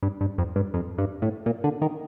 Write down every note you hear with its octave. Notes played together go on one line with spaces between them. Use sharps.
G2
G2
F2
G2
F2
G2
A2
A#2
D3
D#3